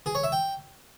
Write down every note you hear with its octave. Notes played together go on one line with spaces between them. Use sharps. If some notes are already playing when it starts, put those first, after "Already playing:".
G#4
C#5
E5
G5